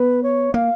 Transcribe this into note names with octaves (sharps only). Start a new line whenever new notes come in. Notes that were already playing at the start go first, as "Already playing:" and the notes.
Already playing: B3 B4
C#5
A#3 F5